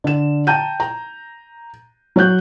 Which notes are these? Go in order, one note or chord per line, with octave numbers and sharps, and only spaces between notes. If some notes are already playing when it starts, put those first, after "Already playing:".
D3 E7
G5 A5 A#5 G6 D#7
A#5
F#3 C#5 F#6 G6